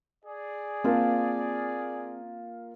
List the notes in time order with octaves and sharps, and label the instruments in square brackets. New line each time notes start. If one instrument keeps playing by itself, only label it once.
[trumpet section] G#4 D5
[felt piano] A#3 F4 [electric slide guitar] C4 A5